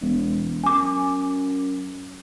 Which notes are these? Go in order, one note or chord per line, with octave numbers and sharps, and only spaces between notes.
E1
F#2 G#5 D6